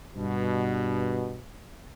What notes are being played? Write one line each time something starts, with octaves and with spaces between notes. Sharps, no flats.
G2 B2